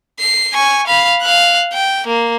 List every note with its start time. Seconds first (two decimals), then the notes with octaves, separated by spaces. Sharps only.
0.20 C7
0.53 G#5 C#6
0.87 F5 B5
1.22 F5 F#6
1.73 G5
2.07 A#3